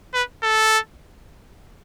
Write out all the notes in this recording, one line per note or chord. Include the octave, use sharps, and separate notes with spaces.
B4
A4